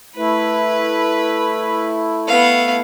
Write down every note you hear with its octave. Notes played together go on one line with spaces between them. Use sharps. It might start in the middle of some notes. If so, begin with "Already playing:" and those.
A3 E4 B4
B3 F5